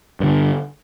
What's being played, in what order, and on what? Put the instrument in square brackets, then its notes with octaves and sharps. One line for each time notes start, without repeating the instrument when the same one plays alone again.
[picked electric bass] G2 D3